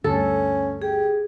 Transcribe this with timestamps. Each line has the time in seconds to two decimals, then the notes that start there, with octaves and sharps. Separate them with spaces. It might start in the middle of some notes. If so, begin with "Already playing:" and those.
0.04 D2 G2 C#4 A4
0.82 G4 G#4